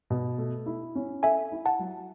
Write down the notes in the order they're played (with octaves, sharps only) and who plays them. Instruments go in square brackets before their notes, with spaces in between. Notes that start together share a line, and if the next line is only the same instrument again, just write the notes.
[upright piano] B2
A3
E4
C#4
[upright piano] A4 [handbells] E5 G#5
[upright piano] E4
[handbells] F#5 A5
[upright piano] F#3